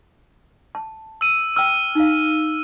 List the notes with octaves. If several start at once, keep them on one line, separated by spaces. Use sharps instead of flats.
A5
E6 D#7
G5 A#5 E6 F6
D#4 F5